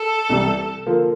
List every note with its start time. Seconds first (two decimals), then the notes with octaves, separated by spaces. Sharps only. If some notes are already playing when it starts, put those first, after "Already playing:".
Already playing: A4
0.29 C2 C3 E3 G3
0.86 D3 F3 A#3 F4 A#4